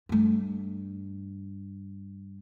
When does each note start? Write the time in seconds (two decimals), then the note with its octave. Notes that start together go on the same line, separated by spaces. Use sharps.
0.09 G2 A3